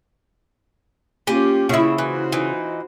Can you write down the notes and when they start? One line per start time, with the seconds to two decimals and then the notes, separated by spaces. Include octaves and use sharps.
1.27 A#3 C#4 F4 G4 G#5
1.69 C#3 E4 F#4 E5
1.98 E3 F4 F#4 C5
2.32 E3 D#4